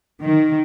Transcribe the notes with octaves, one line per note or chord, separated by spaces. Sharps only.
D#3